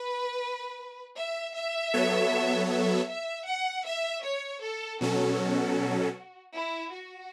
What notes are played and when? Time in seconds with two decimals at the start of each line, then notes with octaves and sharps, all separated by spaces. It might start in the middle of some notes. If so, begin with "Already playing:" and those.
Already playing: B4
1.17 E5
1.56 E5
1.94 F#3 B3 A4 C#5
2.70 E5
3.09 E5
3.47 F#5
3.86 E5
4.24 C#5
4.62 A4
5.01 B2 F#3 C#4 F#4 A4
6.54 E4
6.92 F#4